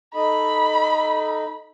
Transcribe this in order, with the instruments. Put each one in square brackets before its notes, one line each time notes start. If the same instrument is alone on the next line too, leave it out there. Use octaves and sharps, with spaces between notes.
[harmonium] D#4 A4 D#5 [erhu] B5